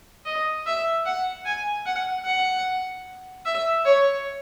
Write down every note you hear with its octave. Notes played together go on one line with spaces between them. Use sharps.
D#5
E5
F#5
G#5
F#5
F#5
E5
C#5